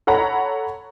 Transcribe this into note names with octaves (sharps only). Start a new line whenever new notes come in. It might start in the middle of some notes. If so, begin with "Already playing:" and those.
A4 C#5 F#5 A#5 B5